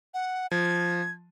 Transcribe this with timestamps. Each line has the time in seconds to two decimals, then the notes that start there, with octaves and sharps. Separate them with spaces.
0.14 F#5
0.51 F3 G#6